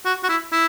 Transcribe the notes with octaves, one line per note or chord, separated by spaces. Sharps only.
F#4
F#4
E4
E4